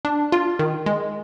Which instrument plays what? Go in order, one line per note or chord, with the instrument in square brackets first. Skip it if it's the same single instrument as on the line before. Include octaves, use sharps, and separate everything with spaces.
[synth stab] D4
F4
D#3
G#3